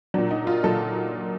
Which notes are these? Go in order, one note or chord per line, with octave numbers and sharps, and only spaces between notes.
A#2 F#3 D4
D#4
F4
A#2 F#3 A4